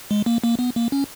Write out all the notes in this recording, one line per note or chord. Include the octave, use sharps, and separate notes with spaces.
G#3
A#3
A#3
B3
A#3
C#4